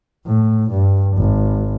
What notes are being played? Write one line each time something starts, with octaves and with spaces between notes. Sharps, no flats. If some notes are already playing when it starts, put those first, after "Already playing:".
A2
G2
G#1